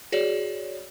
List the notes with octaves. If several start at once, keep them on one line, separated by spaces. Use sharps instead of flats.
F#4 G#4 C#5 D5